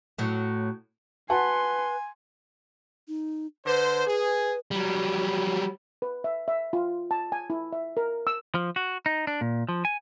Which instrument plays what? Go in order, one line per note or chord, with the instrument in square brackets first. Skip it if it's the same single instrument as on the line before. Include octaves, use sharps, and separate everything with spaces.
[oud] A2 F#3
[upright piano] F#4 F#5 A5 [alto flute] B4 [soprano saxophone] G#5 [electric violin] C6
[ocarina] D#4
[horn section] D3 C5 [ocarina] B4
[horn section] G#4
[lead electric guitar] F#3 G3
[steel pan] B4
E5
E5
F4
A5
G#5
E4
E5
A#4
E6
[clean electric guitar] F3
F#4
D#4
D4
A#2
F3
G#5